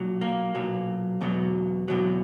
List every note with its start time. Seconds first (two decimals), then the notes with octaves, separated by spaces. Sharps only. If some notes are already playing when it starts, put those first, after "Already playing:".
Already playing: B1 A#2 F#3
0.21 A#3
0.55 B1 A#2 F#3
1.21 E2 B2 F#3
1.88 E2 B2 F#3